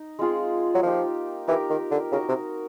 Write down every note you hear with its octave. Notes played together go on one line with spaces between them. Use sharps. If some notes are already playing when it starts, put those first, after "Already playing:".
Already playing: D#4
G#3 C4 F4 G#4
F#3
F3 A#3 D#4 G4
E3 D#4 G4 A#4
D#3
D3
C#3 D#4 F#4 A#4
C3